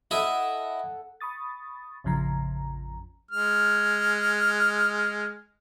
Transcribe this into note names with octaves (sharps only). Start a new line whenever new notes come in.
E4 A4 D#5 E5 F#5
B5 C#6 D#6 A6
A1 F2 C#3 F3 A#5
G#3 F6